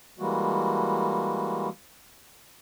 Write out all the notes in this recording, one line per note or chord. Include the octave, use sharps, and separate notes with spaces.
E3 G3 G#3 A#3 F#4